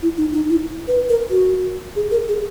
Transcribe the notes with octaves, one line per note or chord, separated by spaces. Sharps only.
E4
D#4
D#4
E4
B4
A#4
F#4
G#4
A#4
G#4